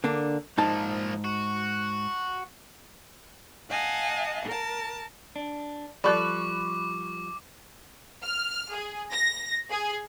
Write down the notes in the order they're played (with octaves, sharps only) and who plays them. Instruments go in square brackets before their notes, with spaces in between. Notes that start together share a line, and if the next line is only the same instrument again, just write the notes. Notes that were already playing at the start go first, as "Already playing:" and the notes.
[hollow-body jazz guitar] D3 A#3 D4
[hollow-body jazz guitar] G#2 D#4 A5 [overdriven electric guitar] F3 A#3
[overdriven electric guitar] F#4
[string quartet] D#5 F5 F#5 G#5 A5
A#4 A5
[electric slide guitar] D4
[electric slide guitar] F3 G3 [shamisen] A4 D5 [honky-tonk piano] B5 C#6 F#6 [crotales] D6
[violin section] F6
G#4
A#6
G#4